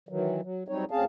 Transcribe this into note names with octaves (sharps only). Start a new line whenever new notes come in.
D#3 E3 F#3
F#3
F#3 G3 C4 D#4 C#5
D2 C4 C#4 G#4 F5 A5